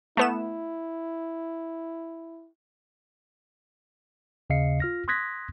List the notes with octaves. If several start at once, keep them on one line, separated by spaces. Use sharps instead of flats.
A3 B3 E4 E7
D#2 C#3 D#5 F5 C7 C#7
F4 F6 A#6
C6 D#6 F#6 G#6 A#6 B6